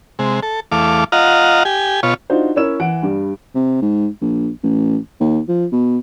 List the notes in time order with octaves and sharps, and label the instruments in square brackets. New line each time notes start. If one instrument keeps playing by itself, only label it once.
[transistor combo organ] C3 G#3
A4
E2 A3 F5 D6
F4 D#5 F5 F#5 A#5
G4 G#5
B2 F4 C#5
[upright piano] D4 D#4 F4 F#4 C5
C#4 E4 A#4 C#5 E6 E7
E3 F#5 D7
G2 G3
[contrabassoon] C3
G#2
A#1
A1
D#2
F3
B2